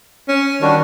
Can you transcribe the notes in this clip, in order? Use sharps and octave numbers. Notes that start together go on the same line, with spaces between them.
C#4
D#3 G3 D4 F#4